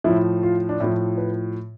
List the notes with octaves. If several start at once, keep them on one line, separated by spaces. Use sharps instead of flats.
A2 F3 E4
F4
D4
A2 F3 E4
B4